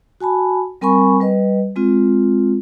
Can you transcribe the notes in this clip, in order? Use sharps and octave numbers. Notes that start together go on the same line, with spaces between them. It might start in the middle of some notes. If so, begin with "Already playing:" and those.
F#4 G#5 A5 B5
G3 C4 A#4 G#5 B5 C#6
G3 B4 D#5
G#3 C4 F4